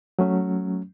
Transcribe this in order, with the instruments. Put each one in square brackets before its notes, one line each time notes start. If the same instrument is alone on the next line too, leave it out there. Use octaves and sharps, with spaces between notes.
[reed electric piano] F#3 A3 C#4